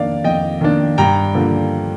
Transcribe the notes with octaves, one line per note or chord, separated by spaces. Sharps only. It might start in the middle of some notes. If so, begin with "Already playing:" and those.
Already playing: F2 D#3 A#3 D4 D5 F5
F2 D#5 G5
D#3 A#3 D4
G2 G5 A#5
D3 F3 A#3